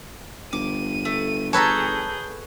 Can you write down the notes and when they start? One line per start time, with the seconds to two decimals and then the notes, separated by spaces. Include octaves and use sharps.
0.53 G1 D6 D#7
1.05 A3
1.53 G#4 A4 B4 C#5 A5 A#5 G6